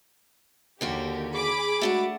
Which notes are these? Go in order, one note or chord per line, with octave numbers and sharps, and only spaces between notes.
D#2 D3 A#3 F#4 G4
G#4 B5 D6
G#3 A3 D4 F#4 F#5